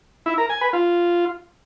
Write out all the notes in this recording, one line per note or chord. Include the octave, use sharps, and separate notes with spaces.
E4
A#4
G#5
B4
F4